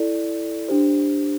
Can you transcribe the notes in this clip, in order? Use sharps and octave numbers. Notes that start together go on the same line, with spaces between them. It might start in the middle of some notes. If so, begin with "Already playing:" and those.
Already playing: E4 A4 D5
D4 G4 C5